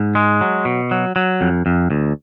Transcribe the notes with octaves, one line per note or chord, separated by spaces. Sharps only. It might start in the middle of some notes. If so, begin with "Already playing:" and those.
Already playing: G#2
G#3
F#3
B2
F#3
F#3
F2
F2
D2